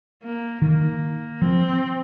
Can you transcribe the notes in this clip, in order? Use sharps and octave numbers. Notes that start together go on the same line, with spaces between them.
A#3
D#3 A#3
F3 C4